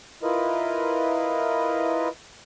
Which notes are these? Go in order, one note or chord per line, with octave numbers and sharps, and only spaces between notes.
E4 F4 A#4 B4 D#5